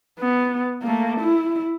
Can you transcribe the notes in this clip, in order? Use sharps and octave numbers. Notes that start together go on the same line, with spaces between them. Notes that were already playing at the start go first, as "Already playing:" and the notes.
B3
A3 A#3
E4